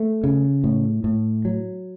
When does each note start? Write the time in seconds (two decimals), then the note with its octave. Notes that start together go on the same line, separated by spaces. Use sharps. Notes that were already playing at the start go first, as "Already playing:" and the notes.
Already playing: A3
0.24 C#3
0.64 A2
1.04 A2
1.45 F#3